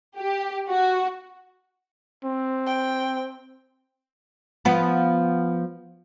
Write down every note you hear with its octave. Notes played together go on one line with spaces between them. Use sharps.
G4
F#4
C4
G5
F3 B3